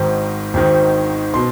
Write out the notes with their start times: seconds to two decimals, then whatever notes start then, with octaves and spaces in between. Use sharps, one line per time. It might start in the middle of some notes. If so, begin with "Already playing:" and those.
Already playing: G#1 G#2 D#3
0.54 G#1 G#2 D#3
1.34 B2 C6